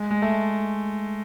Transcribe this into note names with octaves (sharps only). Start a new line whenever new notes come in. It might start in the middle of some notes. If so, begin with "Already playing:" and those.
Already playing: G#3
G#3
A3